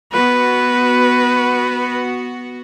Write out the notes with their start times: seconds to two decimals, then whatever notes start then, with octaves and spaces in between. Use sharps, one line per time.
0.12 B3 F#4 B4